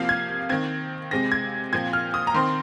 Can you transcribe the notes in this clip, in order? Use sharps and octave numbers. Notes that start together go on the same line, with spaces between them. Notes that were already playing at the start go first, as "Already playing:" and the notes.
Already playing: C3 F3 A#3 F5
G#6
D#3 C4 G#6
C3 G#3 C4 A#6
G#6
A#2 F3 C4 G#6
F6
D#6
A#5
D#3 C4 C6